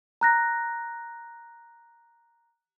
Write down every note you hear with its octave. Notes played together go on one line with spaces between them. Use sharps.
A#5 F#6 A#6